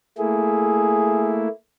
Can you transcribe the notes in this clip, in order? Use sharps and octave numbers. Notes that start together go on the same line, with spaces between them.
A3 A#3 E4 G#4